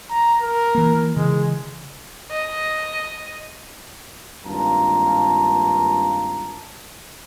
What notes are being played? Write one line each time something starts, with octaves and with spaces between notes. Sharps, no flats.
A#5
A#4
E3 A#3
C#3 E3 G#3
D#5
G#1 G2 A#3 F4 A5 A#5